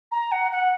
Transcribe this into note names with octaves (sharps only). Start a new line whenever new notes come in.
A#5
F#5
F#5